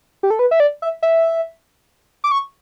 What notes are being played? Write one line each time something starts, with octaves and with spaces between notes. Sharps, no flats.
G4
A4
B4
E5
D5
E5
E5
D6
C#6